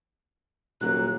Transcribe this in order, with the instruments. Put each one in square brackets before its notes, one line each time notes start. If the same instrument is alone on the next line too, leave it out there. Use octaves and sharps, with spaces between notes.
[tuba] D#1 [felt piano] A#2 F#3 A#3 [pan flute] F#6